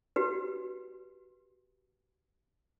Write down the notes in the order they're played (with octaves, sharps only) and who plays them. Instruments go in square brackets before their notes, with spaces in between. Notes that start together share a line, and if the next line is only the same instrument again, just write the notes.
[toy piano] F#4 G4 B4